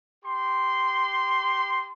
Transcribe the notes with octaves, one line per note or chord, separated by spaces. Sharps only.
G4 C6